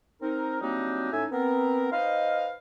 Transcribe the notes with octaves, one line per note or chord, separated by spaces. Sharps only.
C4 D#4 A#4
F#3 G3 A#3 C4 D4 D#4
A2 A3 C#4 D#4 E5 G#5
B3 C4 A#4
D#4 B4 C5 D#5 F5